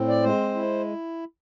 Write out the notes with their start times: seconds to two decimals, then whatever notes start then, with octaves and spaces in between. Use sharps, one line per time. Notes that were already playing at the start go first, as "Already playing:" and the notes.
Already playing: A2 C4
0.08 D5
0.23 G#3 C5
0.55 E4